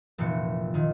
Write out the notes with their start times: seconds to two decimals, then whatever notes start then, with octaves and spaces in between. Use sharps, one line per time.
0.18 F1 A#2 E3 C#7
0.74 A#2 D#3